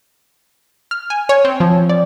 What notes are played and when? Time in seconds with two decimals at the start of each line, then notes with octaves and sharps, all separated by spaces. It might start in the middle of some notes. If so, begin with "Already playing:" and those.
0.91 F6
1.10 G#5
1.29 C#5
1.45 C4
1.60 F3
1.89 D5